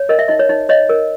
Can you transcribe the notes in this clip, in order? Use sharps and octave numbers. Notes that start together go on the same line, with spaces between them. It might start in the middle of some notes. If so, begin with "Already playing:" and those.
Already playing: C#5
A#4 D#5
E5
D#4 D#5
C#5
D#4
C#5 D#5
A#4